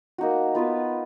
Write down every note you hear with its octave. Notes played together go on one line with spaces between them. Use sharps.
A#3 D#4 F#4
B3 F4 B4